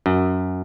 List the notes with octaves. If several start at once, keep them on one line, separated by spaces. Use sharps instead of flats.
F#2